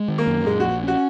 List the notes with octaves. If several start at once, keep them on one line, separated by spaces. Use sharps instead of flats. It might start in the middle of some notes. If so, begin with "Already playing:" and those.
Already playing: G#3
D#3
A#3
F#2
A#2 G#3
A#1 F#4
C#4 F#4